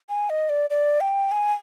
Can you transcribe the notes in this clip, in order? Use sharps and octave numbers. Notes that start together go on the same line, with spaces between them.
G#5
D#5
D5
D5
G5
G#5